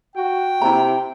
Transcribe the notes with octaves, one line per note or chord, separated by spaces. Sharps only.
F#4 G5
C3 E4 A#5